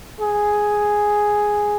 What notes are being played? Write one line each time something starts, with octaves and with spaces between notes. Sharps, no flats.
G#4